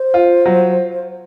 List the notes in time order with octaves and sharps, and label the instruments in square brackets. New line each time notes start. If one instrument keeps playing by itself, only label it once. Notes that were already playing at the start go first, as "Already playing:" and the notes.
Already playing: [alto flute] C5
[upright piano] F4
F#3